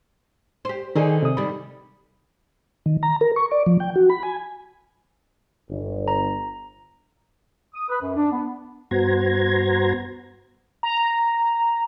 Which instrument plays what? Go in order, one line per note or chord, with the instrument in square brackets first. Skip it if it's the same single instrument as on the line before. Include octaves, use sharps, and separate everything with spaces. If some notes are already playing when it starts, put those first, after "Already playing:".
[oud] G4 C5
[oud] D3 D#4 G#4 [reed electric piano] D#3
[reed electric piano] C3 D#6
[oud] D#3 G3 [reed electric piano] B5
[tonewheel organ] D#3
A#5
A#4
C#6
D5
F3
G5
F#4
B5
G#5
[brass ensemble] G1
[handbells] A#5
[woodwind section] D#6
B4
F#2
D4
B3
[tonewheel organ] G2 B3 F#4 C5 A#5 G#6
[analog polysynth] A#5